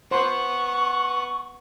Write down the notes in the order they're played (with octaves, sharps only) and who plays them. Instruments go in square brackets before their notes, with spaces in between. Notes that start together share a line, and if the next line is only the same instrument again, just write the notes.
[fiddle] B3 F#5 [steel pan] C5 C6 [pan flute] C#6